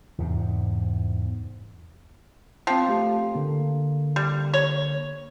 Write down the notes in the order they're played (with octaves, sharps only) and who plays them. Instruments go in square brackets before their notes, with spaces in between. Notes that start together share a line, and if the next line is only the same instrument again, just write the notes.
[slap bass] E2 G#2 C3
[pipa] F3 [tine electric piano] C4 G5
[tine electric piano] A3 G4
D3 A#3
[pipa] G3
C#5